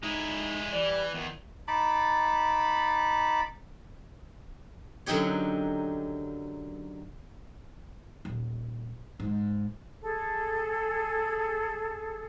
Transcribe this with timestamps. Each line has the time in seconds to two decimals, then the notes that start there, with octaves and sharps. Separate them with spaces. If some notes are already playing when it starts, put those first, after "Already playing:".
0.03 G#3 D#4 E4
0.73 E3 G4 D5
1.14 E2 D#3
1.68 D#4 A5 B5 D6
5.06 F#2 D3 F#3 D#4 G4 C#5
8.25 D#1
9.20 G#2
10.02 G#4 A4